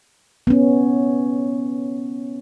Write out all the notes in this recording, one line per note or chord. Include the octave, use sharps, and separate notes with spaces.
B3 C#4